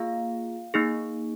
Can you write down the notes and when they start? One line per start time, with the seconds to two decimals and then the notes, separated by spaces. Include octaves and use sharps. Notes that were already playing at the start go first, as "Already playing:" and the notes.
Already playing: A#3 F4 G#4 F5
0.74 A#3 D#4 G#4